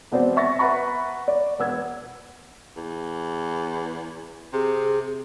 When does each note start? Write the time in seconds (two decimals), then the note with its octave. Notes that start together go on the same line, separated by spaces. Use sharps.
0.11 E1 B2 B3 C4 C5 D5
0.36 E5 C#6 A6 A#6
0.59 B4 E5 F#5 A#5 B5 C#6
1.28 D5
1.59 E1 B3 E6 G#6
2.76 E2
4.53 C3 G#4